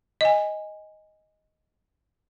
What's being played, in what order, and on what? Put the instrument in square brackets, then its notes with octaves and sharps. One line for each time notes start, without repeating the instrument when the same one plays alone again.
[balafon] D#5 G#5